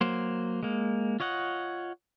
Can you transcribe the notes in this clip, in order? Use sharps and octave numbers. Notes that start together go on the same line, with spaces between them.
F#3 A#3 C5
G#3 A#3
F4 C#5 D#5 F#5